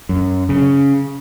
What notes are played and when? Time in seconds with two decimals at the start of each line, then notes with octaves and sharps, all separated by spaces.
0.09 F#2
0.49 C#3